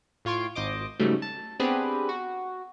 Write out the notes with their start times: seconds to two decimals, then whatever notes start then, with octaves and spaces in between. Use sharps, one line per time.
0.25 A2 F4 C#5 C6 D7
0.55 G#1 C5 D#5 D6
1.00 G#2 C#3 F#3 G3 A3
1.22 A5
1.60 B3 C4 D4 G4 G#4 B4
2.09 F#4